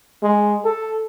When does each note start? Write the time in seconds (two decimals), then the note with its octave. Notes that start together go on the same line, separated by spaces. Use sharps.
0.23 G#3
0.65 A4